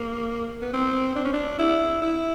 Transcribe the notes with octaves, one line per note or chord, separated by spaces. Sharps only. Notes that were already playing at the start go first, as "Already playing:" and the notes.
Already playing: A#3
B3
C4
D4
C#4
D4
E4
E4